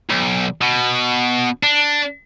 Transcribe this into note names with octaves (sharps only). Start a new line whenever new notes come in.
B1
B2
D4